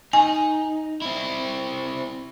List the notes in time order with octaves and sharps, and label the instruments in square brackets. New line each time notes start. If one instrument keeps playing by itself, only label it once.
[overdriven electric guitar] D#4 [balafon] G#5
[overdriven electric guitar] C4 E4